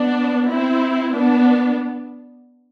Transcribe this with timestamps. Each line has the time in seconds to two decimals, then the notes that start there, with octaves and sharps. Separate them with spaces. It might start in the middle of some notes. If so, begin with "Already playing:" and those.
Already playing: B3 D4
0.49 C4 E4
1.14 B3 D4